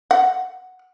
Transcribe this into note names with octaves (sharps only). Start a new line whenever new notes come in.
F#5